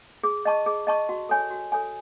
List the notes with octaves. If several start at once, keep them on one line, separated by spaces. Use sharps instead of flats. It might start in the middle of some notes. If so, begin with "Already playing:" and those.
G#4
D#5 A5 C#6
G#4
D#5 A5 C#6
F#4
A4 C#5 G#5
F#4
A4 C#5 G#5